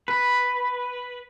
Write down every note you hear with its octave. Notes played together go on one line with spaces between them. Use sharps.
B4